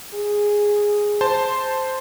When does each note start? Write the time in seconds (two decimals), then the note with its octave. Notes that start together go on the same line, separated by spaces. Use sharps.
0.14 G#4
1.21 C5 A5 C6